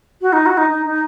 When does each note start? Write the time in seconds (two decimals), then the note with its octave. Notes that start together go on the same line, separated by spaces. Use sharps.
0.21 F#4
0.32 D#4
0.46 F#4
0.57 D#4
0.69 D#4
0.86 D#4